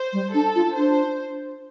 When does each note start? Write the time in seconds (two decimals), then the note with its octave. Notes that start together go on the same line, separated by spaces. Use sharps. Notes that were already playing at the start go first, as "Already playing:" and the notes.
Already playing: C5
0.13 G3
0.34 D4 A4
0.55 F4
0.76 D4 C5